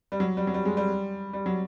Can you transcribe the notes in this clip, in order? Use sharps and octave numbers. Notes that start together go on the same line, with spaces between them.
G3
F#3
G3
F#3
G3
G#3
G3
G3
F#3